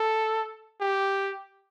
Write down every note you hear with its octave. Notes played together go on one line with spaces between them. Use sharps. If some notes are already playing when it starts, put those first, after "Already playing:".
Already playing: A4
G4